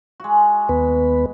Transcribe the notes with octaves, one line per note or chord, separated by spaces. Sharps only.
G#3 F#4
D#2 B3 B4